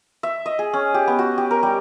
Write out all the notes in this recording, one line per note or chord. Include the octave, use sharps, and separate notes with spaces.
E5
D#5
G#4
C#4
G4
B3
F#4
G4
A#4
G3